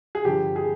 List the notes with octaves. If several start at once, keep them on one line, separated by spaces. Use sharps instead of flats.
G#4
G2 D3 F3 G4
G#4